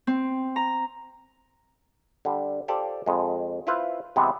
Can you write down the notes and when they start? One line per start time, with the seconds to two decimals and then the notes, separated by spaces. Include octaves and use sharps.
0.07 C4
0.56 A#5
2.25 D3 G3
2.68 F4 G4 A4 C5 D5
3.06 F2 G#3
3.67 E4 F4 B4 C5
4.16 C3 E3 G#3 B3 C4